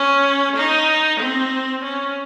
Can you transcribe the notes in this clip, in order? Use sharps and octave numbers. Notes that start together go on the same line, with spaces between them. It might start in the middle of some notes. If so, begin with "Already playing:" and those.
Already playing: C#4
D#4
C4
C#4